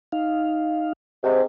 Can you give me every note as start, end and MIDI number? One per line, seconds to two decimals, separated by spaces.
0.12 0.93 63
0.12 0.93 77
1.24 1.43 44
1.24 1.43 48